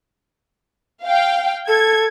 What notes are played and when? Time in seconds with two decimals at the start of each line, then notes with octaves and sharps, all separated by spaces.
1.03 F5 G5
1.68 A4 G#6